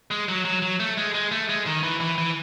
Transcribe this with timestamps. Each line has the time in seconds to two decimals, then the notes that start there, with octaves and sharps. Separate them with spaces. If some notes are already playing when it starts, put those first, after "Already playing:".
0.11 G#3
0.28 F#3
0.45 F#3
0.63 F#3
0.80 A3
0.97 G#3
1.14 G#3
1.32 A3
1.49 G#3
1.67 D#3
1.83 E3
2.01 E3
2.18 E3